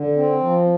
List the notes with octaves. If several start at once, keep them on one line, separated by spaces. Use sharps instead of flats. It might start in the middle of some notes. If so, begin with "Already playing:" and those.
Already playing: D3
C4
F3